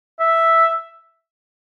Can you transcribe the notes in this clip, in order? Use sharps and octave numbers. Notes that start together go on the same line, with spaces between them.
E5